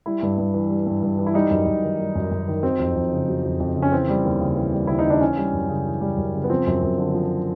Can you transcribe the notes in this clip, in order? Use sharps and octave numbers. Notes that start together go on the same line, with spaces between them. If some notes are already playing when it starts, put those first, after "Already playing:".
G3 E4
G2
G2
E3
G3
G2
G2
E3
E4
G3 D#4
F#2
F#2
D#3
G3
F#2
F#2
D#3
F#3 C4
F2
F2
C#3
F#3
F2
F2
C#3
C#4
E3 C4
G3
D#2
C#3
E3
G3
D#2 E4
D#4
C#3 D4
E3 C#4
G3
F#2
C#3
E3
G3
F#2
C#3
B3
F3 C4
F#2
F#2
D3
F3